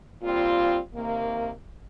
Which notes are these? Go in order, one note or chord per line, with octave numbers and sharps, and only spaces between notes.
A#2 G3 C4 F4
C3 D#3 A#3